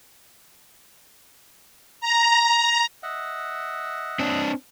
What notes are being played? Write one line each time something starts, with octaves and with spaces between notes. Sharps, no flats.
A#5
D#5 E5 F#5
C4 D4